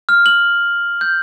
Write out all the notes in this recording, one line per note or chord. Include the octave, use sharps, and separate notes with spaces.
F6
F#7
G6